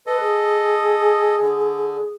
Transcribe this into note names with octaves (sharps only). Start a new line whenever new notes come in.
A4 B4 D#5
G#4
D3